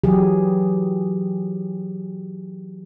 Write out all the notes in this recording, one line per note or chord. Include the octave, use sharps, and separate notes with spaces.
E3 F#3 G4 G#4